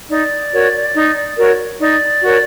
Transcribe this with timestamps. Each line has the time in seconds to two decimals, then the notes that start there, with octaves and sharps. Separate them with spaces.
0.09 D#4 D5
0.52 F#4 A#4 C#5
0.94 D#4
1.37 F#4 A#4 C#5
1.80 D#4 D5
2.21 F#4 A#4 C#5